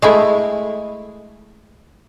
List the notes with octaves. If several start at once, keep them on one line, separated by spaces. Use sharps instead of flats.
G#3 A3 E4